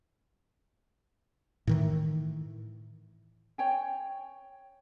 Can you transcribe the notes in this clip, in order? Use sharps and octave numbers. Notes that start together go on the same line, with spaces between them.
A2 D#3 E3
C#5 G5 G#5